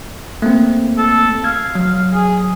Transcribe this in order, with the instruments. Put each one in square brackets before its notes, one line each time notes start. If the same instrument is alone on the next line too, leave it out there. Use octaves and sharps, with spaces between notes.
[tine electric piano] A3 A#3 C4
[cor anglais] A4
[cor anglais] F5 [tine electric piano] G#6
[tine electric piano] F#3
[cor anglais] G#4